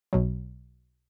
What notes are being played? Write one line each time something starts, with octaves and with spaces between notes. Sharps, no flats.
B1 B2 F#3